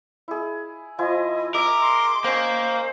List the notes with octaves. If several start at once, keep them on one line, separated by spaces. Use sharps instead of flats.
E4 G#4
F3 E4 D#5 G#5
A#4 D#5 E5 D6 D#6
C6
A#3 C#4 C5 G5